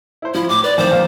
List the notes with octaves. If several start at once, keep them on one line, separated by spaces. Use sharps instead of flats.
E4 C5
F3 E4
A2 D6
B4 D5
F2 D#3 A3 C5
F2 A#2 F5